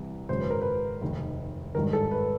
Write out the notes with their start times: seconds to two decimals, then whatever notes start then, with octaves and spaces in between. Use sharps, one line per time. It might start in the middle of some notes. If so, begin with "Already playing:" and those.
Already playing: C2 C3 E3
0.29 G#1 F#2 C#3 C5
0.40 B4
0.50 A#4
0.61 B4
1.02 F1 D#2 D#3
1.75 G#1 G2 D#3 A#4
1.93 A4
2.11 B4